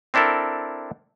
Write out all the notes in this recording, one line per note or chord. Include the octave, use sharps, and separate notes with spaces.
C4 D4 E4 A4 A#4